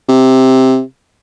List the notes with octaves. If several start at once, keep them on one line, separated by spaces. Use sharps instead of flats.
C3